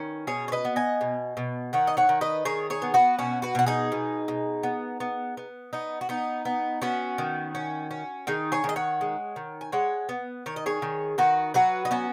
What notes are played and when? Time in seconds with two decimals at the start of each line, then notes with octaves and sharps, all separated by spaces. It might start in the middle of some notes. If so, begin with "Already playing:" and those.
Already playing: D#3 C#4 B4
0.27 B2 G#4 C#5
0.48 C#5
0.52 B4 D#5
0.65 B3
0.76 D#5 G#5
1.01 B2
1.37 B2
1.73 D#3 C#5 F#5
1.87 D#5
1.97 C#5 F#5
2.09 D#3
2.21 B4 D#5
2.45 D#3 G#4 C#5
2.70 G#4 C#5
2.82 B3
2.94 F#4 B4
3.19 B2 C#4 F#4
3.42 F#4 B4
3.55 B2 F#4
3.66 D#4 G#4
3.92 B2
4.28 B2
4.63 B3
5.00 B3
5.37 B3
5.73 B3 D#4
6.01 F#4
6.09 B3 D#4
6.45 B3
6.82 B3 C#4 F#4
7.18 D#3
7.55 C#4
7.91 C#4
8.27 D#3 D#4 G#4
8.52 G#4 C#5
8.64 D#3
8.69 D#5
8.76 C#5 F#5
9.01 G#3
9.36 D#3
9.61 G#5
9.72 G#3 C#5 F#5
10.09 B3
10.46 D#3 C#5
10.56 D#5
10.66 G#4 C#5
10.82 D#3
11.18 D#3 F#4 B4
11.54 F#3 F#4 B4
11.85 D#4
11.91 B3 C#4 F#4